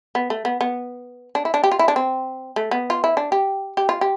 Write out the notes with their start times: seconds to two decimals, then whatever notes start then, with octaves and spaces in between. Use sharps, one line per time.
0.15 B3
0.30 A3
0.45 B3
0.61 B3
1.35 D4
1.45 E4
1.54 D4
1.64 G4
1.72 F4
1.79 E4
1.88 D4
1.96 C4
2.56 A3
2.71 B3
2.90 F4
3.04 E4
3.17 D4
3.32 G4
3.77 G4
3.89 F4
4.01 G4